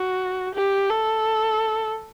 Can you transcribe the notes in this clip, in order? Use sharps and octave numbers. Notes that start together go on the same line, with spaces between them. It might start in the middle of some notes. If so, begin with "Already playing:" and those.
Already playing: F#4
G4
A4